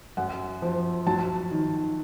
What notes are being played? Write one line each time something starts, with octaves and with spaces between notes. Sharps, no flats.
F#2 F#5
F3
F#3 A5
D#3